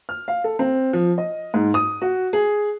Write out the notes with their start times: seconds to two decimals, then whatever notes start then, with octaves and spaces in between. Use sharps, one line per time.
0.09 F6
0.28 F5
0.44 A4
0.59 C4
0.93 F3
1.18 D#5
1.54 G#2
1.74 D#6
2.02 F#4
2.33 G#4